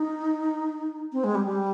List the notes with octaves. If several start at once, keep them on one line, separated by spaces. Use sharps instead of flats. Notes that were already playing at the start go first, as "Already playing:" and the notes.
Already playing: D#4
C4
G#3
G3
G3